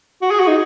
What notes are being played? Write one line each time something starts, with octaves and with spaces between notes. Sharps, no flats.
F#4
G#4
F#4
D#4